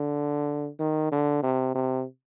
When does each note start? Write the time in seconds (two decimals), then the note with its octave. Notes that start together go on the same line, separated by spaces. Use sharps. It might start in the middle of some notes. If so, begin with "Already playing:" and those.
Already playing: D3
0.79 D#3
1.12 D3
1.43 C3
1.75 C3